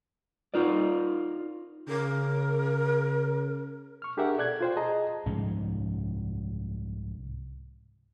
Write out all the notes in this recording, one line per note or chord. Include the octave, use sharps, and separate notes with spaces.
D#4 F4 A#4 D5
C#3 A#4
C#6 F6
D4 G4 G#4 A#4 E5 F#5
A4 D5 F#6 G#6
F4 C5 G5
G#4 D#5 A5 A#5
C2 G#2 F3 C#4